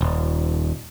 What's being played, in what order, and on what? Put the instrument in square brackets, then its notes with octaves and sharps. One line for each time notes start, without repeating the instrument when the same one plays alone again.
[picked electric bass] D#1